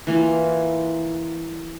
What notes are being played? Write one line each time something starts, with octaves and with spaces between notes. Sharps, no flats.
E3 A#3 F4